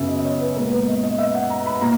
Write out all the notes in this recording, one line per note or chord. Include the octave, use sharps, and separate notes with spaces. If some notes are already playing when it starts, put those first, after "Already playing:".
Already playing: F#2 C#3 B3 E5
D#5
C#5
B4
A#2 G#3 B3 A#4
B4
D#5
D#5
E5
F#5
A#5
B5
A#2 A#5